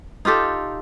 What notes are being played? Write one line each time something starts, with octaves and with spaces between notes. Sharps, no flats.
D#4 F4 G4 A4